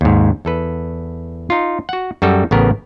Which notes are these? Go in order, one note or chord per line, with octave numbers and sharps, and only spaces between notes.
D#2 G#2
E2 A4 B4
D#4 F4
F#4 F#5
F#2 G3 F#4 A4
A1 C#3 B3 A#4